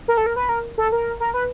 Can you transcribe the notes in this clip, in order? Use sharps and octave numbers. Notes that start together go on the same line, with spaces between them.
A#4
A4
A#4
B4
A#4
A4
A#4
A#4
B4